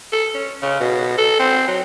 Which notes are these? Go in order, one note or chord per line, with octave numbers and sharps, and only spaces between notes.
A4
C#4
C#3
B2
A4
C4
F#3